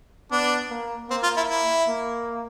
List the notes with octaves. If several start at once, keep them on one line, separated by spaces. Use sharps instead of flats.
B3 D4
A#3
A#3 C4
F4
E4
E4
A#3